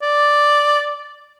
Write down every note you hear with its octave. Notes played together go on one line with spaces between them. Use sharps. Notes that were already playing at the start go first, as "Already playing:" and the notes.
D5